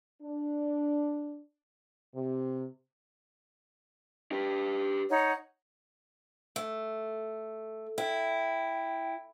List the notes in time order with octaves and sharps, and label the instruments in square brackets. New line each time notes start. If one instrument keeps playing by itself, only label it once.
[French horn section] D4
C3
[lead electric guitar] G4 B4
[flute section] D#4 C#5 F#5
[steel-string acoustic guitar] A3
[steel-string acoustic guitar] E4 [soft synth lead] G5